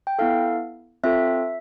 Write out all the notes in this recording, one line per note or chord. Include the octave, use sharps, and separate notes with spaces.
G5
B3 E4 A4 F5
C4 F4 A4 E5